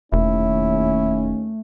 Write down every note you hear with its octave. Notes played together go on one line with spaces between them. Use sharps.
E1 D#2 A3 C#4 E4